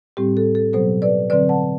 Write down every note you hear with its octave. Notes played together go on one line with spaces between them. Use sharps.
A2 G3 C4 G4
A4
A4
B2 F#3 B3 A4 C5
B4 D5
D3 F#3 C4 B4 D5
F#5 A5